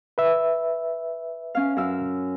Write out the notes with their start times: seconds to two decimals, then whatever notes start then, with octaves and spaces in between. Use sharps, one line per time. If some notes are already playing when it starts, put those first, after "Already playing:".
0.18 B4 E5
1.55 C#4 F5
1.77 F#2 F5 E6